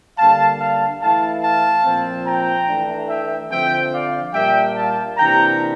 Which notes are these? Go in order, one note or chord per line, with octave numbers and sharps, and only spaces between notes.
D3 G3 A#3 F5 A5
F5 A5
E3 A3 E4 F5 A5
F5 A5
A#2 F3 C4
G5 A#5
E3 A3 D4
E5 G5
D3 F3 C4 E5 G5
D5 F5
A#2 G3 A#3 D4 E5 G5
F5 A5
C3 E3 A#3 D4 G5 A#5